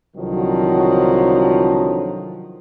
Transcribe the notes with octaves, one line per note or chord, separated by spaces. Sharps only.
C2 D3 D#3 F3 F#3